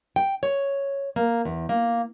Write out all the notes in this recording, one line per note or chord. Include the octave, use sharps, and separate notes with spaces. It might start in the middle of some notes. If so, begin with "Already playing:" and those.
G5
C#5
A#3
E2
A#3